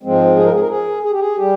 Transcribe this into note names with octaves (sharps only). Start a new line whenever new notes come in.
G#2 F3 G#3 C4
G#4
A#4
G#4
A#4
G#4
G#4
G4
G#4
G3 G4